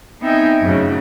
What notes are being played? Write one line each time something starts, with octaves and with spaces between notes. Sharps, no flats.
B3 C4 D#4 E5 G5 G#5
F#2 A2 C#3 F#3